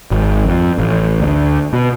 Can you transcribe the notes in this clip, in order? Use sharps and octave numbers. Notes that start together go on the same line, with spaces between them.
G#1
F2
A1
D2
B2